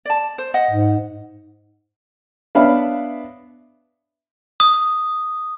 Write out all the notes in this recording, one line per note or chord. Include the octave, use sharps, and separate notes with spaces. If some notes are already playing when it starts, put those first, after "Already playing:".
D5 A5
C5
D#5 F#5
G#2
B3 D4 C#5 E5 F5 B5
D#6